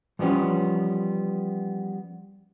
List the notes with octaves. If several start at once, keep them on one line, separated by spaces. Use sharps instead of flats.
E3 F3 G3 B3 C#4